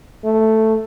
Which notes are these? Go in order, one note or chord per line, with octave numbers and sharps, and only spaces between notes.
A3